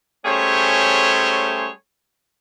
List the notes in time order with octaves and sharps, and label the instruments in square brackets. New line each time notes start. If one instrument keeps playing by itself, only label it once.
[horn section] G3 A3 C#4 G#4 C5 C#5